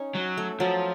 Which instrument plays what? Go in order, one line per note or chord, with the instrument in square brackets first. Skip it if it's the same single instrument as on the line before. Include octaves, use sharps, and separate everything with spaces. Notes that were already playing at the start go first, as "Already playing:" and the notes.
Already playing: [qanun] C#4 D#4
[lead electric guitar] F#3
[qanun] A3
[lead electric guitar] F3 [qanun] F#3